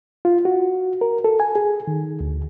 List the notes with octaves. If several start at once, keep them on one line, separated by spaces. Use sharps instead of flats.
F4
F#4
A#4
A4
G#5
G#4
D#3
D2